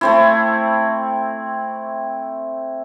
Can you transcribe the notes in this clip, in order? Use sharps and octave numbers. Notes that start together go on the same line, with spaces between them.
A3 C4 E4